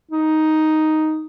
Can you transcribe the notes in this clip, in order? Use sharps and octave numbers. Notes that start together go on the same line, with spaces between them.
D#4